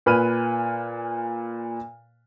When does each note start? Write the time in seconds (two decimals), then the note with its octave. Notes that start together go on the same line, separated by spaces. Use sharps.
0.06 A#2 B4 G#5 F6 D#7